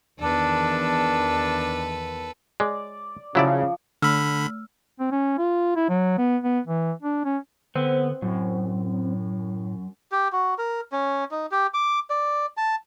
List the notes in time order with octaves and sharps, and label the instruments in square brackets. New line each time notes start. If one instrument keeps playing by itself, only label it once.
[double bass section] E2 D#3 [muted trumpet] D4 [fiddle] A4 B4
[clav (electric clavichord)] G#3 [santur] D5
[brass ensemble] C#3 [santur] F3 [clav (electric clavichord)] F#3 E4 D5
[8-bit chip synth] D3 B5 [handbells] A3 E6 F6
[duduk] C4
C#4
F4
E4
F#3
B3
B3
E3
D4
C#4
[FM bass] D3 [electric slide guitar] B3 [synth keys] C4
[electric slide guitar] F#2 [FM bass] A2
[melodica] G4
F#4
A#4
C#4
D#4
G4
D6
D5
A5